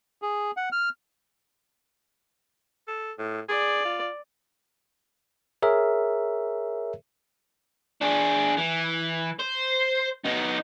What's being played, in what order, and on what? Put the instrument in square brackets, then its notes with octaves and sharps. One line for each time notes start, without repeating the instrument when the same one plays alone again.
[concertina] G#4
F#5
F6
[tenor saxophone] A4
A2
[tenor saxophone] G#4 [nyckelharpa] D5
[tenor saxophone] F4
[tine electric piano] G#4 A#4 C#5 E5
[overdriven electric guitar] D4 G#4
E3
C5
B3 D#4